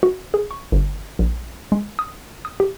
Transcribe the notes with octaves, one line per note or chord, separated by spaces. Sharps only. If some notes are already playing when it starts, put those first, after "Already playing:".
F#4
G#4
C#6
G1
A#1
G#3
D#6
D#6
G4